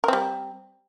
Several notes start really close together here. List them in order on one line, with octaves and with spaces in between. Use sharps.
A#4 C4 G3